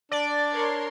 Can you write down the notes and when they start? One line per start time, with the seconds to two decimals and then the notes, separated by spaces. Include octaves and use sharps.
0.11 D4 D5
0.52 A#4 C#5 C6